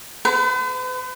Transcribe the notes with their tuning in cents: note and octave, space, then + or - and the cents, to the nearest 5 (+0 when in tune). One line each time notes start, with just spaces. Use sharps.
B4 +45